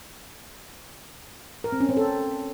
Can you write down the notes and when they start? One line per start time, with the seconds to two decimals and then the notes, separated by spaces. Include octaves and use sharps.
1.64 A#4
1.72 C4
1.81 C#4
1.89 C4
1.97 A4